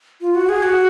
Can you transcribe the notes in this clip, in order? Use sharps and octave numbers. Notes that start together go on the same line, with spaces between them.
F4
F#4
G#4
F#4